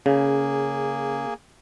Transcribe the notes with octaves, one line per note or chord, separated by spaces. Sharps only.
C#3 A#3 G#4